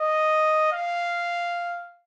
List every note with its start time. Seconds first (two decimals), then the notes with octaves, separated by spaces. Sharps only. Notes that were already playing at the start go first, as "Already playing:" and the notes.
Already playing: D#5
0.72 F5